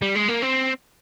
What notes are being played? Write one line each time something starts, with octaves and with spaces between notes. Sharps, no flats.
G3
G#3
A#3
C4